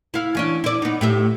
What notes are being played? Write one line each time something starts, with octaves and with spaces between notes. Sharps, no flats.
E4 F5
E3 C#4 D4
E4 D5
B3 D#4
A2 G4 E5